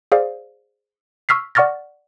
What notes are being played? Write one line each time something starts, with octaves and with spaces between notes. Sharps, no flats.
G#4 C5 D5 F5
C#6 E6 F6 B6 C7
D5 F#5 C#6 F6 A6 A#6